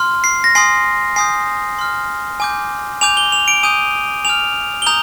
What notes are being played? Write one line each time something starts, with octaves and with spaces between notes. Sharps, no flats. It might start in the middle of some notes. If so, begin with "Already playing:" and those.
Already playing: C6 F6
C7
A#6
G#5 C6 D#6 C7
G#5 D#6 G6 C7
C6 F6
G#5 D6 G6
G#5 D6 G6 F7
G7
F7
D7
G#5 D#6 G6 D#7
G#5 D6 F6 F7
G7
A#5 D#6 G6 F7